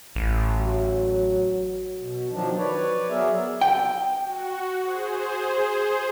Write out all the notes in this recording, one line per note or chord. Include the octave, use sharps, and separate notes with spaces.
A1
F#3
B2
D#3 F3 F#3 D4
B4 C#5 D5
F#3 B3 G#4 A#4 D5 E5
G5
F#4
G#4 C5